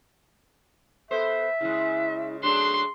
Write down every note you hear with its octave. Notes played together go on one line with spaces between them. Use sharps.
B3 A4 C5 E5
C#3 G#3 E4
F#3 A3 D4 G#4 C6